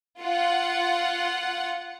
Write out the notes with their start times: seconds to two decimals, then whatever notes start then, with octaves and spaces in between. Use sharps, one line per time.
0.21 F4 F#5